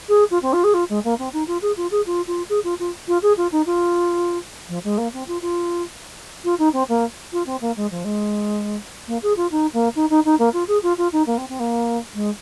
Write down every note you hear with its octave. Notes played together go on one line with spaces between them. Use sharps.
G#4
F4
C4
F4
G#4
F4
G#3
A#3
C4
D#4
F4
G#4
F4
G#4
F4
F4
G#4
F4
F4
F4
G#4
F4
D#4
F4
F3
G#3
A#3
C4
F4
F4
F4
D#4
C4
A#3
F4
C4
A#3
G#3
F3
G#3
A#3
G#4
F4
D#4
A#3
D#4
D#4
D#4
A#3
F4
G#4
F4
F4
D#4
A#3
C4
C4
A#3
G#3